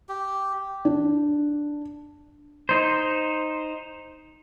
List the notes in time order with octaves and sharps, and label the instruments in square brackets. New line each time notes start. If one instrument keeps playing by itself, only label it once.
[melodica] G4
[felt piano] D4
[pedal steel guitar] D#4 C5